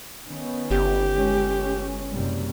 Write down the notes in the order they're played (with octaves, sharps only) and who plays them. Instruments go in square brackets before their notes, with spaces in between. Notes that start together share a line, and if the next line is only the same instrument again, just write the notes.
[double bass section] D#3 B3 C#4
[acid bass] G1 [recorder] G4
[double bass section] G#3 C#4
F#1 C3 G3